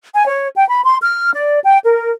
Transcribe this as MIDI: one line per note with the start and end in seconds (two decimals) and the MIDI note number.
0.13 0.26 80
0.26 0.48 73
0.55 0.67 79
0.68 0.82 83
0.85 0.96 84
1.02 1.31 89
1.34 1.59 74
1.63 1.78 79
1.84 2.10 70